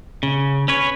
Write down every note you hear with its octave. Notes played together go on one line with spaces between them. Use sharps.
C#3
C#4 B4 C#5